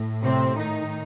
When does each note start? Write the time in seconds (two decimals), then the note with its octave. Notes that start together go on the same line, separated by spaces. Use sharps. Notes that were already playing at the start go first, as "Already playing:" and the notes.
Already playing: A2
0.23 C3 C4
0.58 D#3 D#4